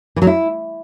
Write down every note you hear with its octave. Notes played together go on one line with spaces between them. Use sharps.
E3
F#3
E4